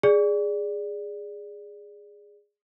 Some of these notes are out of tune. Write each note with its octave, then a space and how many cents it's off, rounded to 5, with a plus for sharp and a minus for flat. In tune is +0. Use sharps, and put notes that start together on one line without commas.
G#4 -10 D5 +0